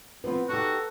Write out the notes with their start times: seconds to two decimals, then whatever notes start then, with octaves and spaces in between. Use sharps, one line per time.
0.24 F3 B3 C4 B4
0.49 D#4 F#4 G4 A4